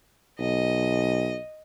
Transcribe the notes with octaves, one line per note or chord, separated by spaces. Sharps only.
B1 D#5